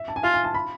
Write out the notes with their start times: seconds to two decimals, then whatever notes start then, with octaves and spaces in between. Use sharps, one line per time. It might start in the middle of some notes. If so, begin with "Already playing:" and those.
Already playing: E5
0.08 A5
0.16 G#5
0.23 F4 F5
0.34 G#5
0.44 A5
0.54 B5